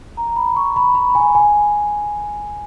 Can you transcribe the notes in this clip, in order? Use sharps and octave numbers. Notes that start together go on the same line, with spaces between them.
A#5
B5
C#6
B5
B5
G#5
G#5